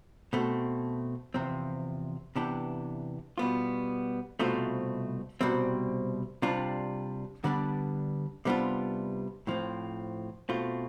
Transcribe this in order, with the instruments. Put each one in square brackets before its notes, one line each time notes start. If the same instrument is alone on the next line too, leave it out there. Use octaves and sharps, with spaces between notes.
[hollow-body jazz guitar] B2 A3 C4
E2 C3 F3 C4
C3 E3 B3 D4 G4
B2 G3 B3 F4
C2 B2 A3 C4 F4
C2 B2 G3 C4
C3 G3 D4 F4
D3 G3 B3 D4
C3 G3 B3 D4 F4
A2 F3 C4
B2 A3 C4 F4